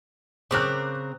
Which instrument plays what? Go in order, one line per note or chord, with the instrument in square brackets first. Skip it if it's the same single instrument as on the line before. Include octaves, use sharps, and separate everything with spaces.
[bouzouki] C#3 C4 A#4 [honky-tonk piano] D6 F#6